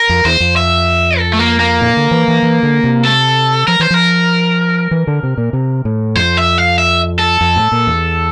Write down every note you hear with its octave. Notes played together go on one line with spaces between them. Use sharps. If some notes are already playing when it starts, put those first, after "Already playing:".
Already playing: A#4
F2
E2 C5
F2
E5
A4
A3
A#3
A#3
A#2
D3
E3
E3
E3
D3
C3
A4
F3 A#4
E3 C5
F3 A#4
E3
D3
C3
A#2
C3
A2
F2 C5
E5
F5
E5
A4
F2
A2
A#2
E2